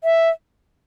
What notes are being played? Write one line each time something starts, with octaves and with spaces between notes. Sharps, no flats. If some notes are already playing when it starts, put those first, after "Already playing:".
E5